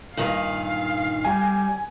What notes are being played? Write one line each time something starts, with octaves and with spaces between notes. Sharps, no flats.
G2 A#2 D#3 F5
G3 G#5